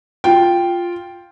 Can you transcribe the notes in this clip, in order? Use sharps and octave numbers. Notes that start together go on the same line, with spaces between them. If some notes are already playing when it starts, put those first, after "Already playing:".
F4 G5